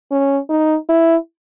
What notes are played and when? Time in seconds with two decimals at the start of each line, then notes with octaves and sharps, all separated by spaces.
0.11 C#4
0.49 D#4
0.89 E4